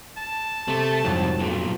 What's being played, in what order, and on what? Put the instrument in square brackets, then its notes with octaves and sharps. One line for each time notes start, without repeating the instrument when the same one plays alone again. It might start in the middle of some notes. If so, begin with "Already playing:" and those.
[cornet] A5
[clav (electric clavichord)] C3 [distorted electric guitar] A3
[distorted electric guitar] C2 [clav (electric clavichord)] F2 G#2 F#3
[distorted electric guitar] B1 A#2